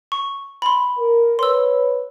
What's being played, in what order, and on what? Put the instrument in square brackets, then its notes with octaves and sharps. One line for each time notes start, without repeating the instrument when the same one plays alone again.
[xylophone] C#6
B5 C6
[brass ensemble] A#4
[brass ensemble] B4 C#5 [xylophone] C6 E6